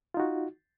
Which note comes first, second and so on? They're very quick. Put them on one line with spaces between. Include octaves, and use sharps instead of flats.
F4 D#4 F#4